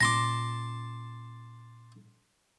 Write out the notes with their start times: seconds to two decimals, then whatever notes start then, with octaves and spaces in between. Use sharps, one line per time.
0.01 A#2 C#4 A5 C6 D6 A#6